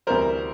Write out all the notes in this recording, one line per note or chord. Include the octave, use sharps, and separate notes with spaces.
D2 C3 E3 G3 A#4 C5